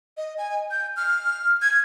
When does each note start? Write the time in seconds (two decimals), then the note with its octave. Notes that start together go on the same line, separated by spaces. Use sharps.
0.17 D#5
0.38 G#5
0.71 G6
0.97 F6
1.62 G#6